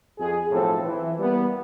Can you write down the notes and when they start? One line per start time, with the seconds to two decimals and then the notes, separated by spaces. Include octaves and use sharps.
0.18 F2 G#4
0.50 B1 A2 F3 C4 A4
0.82 E3
1.18 G3 A#3 B3